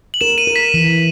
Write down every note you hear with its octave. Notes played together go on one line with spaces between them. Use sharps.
F#7
A#4 E7
D#7
A#4
B6
E3